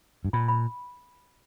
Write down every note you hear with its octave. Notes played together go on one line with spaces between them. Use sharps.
G2
A#2 B5
B5